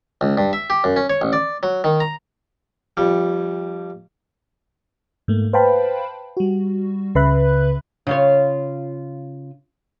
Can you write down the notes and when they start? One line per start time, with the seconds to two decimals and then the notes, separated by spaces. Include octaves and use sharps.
0.21 C#2
0.37 G2
0.53 E5
0.70 G4
0.84 F#2
0.96 C#4
1.10 C#5
1.22 A1
1.33 D5
1.63 F#3
1.84 D#3
2.00 A#5
2.97 F2 G3
5.28 G#2 A3 A#3
5.53 B4 C5 F5 G5 A5 B5
6.37 G3 F#4
7.15 C#2 C#3 B4 E5 B5 F#6
8.07 C#3 F4 C#5